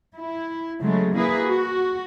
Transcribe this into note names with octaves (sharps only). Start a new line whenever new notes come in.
E4
C#3 F#3 G#3 A3
A#3 E4 G#4 B4
F#4